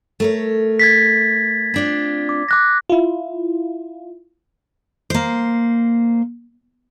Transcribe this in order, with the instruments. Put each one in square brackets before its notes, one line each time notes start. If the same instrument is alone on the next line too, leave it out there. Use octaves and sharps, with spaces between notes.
[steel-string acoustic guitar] A3 A#4 C#5
[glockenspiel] G#6 A6 B6
[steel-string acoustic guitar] C4 D4 F4
[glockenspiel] D6
D6 F#6 A#6
[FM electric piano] E4 F4
[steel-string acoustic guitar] A#3 C5